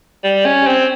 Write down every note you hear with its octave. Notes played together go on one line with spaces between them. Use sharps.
G3
C#4
C4